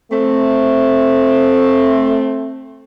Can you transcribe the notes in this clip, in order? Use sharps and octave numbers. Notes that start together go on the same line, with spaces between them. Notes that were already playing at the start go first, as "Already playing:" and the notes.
A3 C4